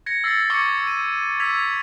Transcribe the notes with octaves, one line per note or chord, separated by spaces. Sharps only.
G#6 A#6 C#7
E6 A6 A#6 C7
C#6 D6 E6 G#6 C#7 G7
D#7
E6 G#6 B6 F7